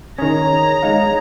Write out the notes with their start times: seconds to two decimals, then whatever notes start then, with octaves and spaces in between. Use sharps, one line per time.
0.19 D#3 C#4 G#4 C#5 A#5
0.83 G#3 D#4 F5